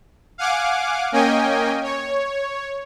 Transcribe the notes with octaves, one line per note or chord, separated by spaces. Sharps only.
F5 F#5 G#5 D6
A#3 C#4 D#5 G5 G#5
C#5